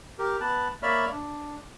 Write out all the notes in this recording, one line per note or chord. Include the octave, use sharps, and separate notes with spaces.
G4 A#4
B3 A5 F#6
A#3 C#5 D5 E5 B5 F6
D4